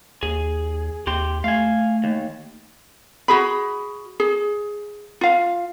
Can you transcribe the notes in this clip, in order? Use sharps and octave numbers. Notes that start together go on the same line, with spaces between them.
D#2 G#4
D#2 G4 C6
A3 F5 G#5
D#2
F#4 G#4 B5
G#4
F4 F5